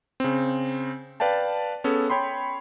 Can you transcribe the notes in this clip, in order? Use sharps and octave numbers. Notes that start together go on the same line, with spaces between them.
C#3 C4
B4 D5 F5 G5 A5
B3 C#4 G#4 A4
C#5 G5 B5 C6